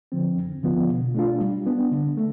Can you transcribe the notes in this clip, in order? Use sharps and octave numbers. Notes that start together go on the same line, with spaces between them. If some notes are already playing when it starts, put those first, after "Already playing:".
D3 F3 C4
F2
D3 F3 B3 F4
B2
A3 D4 F4
G3
B3 D4
D3
A3